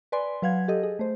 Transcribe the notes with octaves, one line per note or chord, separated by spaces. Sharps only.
B4 D5 G#5 C6
F#3 B4 F5 F#5 G#6
G4 A4 D#5
G#4
A3 C5